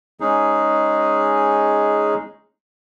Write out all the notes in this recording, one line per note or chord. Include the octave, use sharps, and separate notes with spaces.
G#3 C#4 D#4 G#4